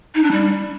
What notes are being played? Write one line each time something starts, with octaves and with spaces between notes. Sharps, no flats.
D#4
D4
G3